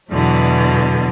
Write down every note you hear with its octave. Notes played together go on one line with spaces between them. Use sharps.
E2 B2 D3 E3 F#3